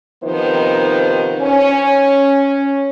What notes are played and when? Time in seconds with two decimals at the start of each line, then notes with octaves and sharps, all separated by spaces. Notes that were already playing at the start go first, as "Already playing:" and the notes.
0.23 C3 D#3 F3 B3 D#4 C5
1.40 C#4